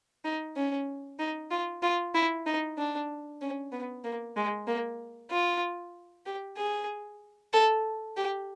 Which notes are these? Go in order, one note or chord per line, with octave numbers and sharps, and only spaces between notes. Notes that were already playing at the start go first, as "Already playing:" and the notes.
D#4
C#4
D#4
F4
F4
E4
D#4
D4
C#4
B3
A#3
G#3
A#3
F4
G4
G#4
A4
G4